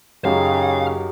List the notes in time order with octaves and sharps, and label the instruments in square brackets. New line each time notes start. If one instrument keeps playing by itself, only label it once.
[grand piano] F#2 D#4 [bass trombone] C#3 [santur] F#3 G4 G#4 [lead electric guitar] F5